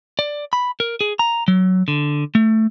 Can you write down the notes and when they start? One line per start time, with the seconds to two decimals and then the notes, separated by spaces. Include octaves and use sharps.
0.19 D5
0.53 B5
0.80 A#4
1.01 G#4
1.19 A#5
1.48 F#3
1.88 D3
2.35 A3